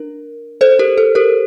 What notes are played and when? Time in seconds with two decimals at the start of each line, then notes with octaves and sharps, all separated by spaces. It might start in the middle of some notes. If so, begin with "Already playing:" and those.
Already playing: D4 A#4
0.61 A4 C5
0.79 G4 A#4
0.98 A4
1.15 G4 A#4